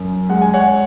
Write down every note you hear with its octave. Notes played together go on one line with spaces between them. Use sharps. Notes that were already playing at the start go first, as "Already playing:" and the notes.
Already playing: F#2
G#3 F#5
G#5
C#5 F#5